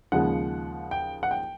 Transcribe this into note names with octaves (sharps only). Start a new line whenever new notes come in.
D#2 C#3 F3 G#3 F#5
G5
F#5
G5